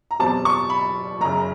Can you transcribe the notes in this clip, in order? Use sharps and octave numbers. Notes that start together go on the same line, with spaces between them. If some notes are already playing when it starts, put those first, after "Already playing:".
A#5
F#1 E2 B2 G3 C4 A5
C#6
B5
F#1 F#2 C#3 A#5